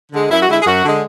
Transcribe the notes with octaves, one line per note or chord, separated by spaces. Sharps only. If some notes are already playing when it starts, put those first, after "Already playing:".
D3 G#3
F#2 E4
F#4
D3 G#3 E4
G#4
F#2 F#4
D3 G#3